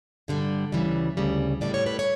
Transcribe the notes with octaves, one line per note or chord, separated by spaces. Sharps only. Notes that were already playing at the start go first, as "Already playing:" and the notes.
G2 D3 G3
D2 C#3 E3 G3
D2 C#3 G3
A2 G3 D5
C#5
B4
C#5